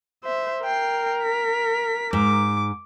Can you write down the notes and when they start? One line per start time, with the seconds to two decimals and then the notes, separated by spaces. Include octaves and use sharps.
0.24 C5 E5
0.64 A#4 G5 C7
1.23 B6
2.13 G#2 D6